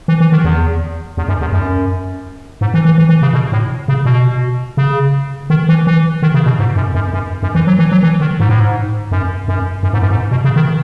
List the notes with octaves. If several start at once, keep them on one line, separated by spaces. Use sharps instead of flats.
E3
E3
D#3
E2
E2
F#2
E2
F#2
G#2
E3
E3
E3
E3
C#3
B2
A2
C#3
B2
C#3
D#3
E3
E3
D#3
C#3
B2
G#2
F#2
F#2
F#2
F#2
E3
F#3
E3
F#3
E3
D#3
G#2
A2
G#2
F#2
F#2
F#2
G#2
F#2
G#2
B2
C#3
D#3